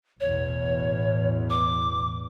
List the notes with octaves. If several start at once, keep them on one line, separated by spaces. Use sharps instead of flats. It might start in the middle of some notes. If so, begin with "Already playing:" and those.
A1 E2 B2 C#5
D6